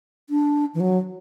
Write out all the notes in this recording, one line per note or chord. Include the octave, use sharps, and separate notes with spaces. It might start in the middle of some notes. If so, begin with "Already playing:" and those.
D4
E3
F#3